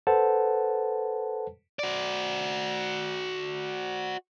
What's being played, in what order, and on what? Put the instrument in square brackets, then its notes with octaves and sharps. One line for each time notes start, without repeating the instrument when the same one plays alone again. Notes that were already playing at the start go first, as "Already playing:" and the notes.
[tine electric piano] A4 B4 C5 F#5 A5
[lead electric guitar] F#4 D5